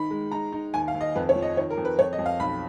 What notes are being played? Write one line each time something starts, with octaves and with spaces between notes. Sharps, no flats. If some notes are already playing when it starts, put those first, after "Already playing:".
Already playing: D#3 D#4 B5
G#3
D#4 A#5
D#4
D#2 G#5
F5
D#2
D#5
F2 B4
C#5
F3
D#5
D#3 C#5
A#4
F2
B4
F2 C#5
D#5
F2
F5
B1 B5